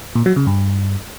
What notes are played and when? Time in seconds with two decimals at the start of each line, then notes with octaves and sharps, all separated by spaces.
0.15 A#2
0.26 F#3
0.36 C#3
0.47 G2